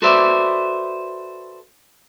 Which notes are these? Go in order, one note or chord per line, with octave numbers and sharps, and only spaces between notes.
F#4 A4 B4 C5 D5 E5